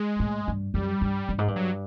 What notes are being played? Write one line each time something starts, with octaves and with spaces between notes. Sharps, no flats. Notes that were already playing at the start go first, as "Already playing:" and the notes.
Already playing: G#3
A2
G2
F#2 G3
G2
G2
G#2
G2
F#3